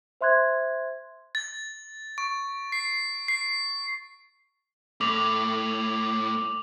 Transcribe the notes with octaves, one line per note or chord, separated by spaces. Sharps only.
C5 E5 C6 F#6 G#6
A6
C#6
C7
C7
A2 D6 F7 F#7